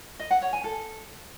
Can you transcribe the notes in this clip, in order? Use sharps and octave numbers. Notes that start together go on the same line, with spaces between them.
D#5
F#5
C#5
G#5
A4